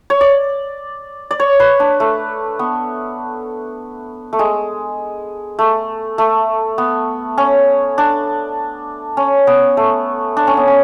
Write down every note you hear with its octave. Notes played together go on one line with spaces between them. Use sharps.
C#5
D5
D5
C#5
B4
D4
A3
B3
A3
G#3
A3
A3
B3
C#4
D4
C#4
B3
A3
D4
C#4
B3
C#4